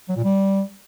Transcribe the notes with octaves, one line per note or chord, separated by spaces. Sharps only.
F#3
A#2
G3